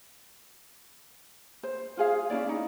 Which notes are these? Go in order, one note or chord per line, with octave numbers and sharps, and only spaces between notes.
C5
F4 G#4 F5
C#4 D4 E4 D5
D#4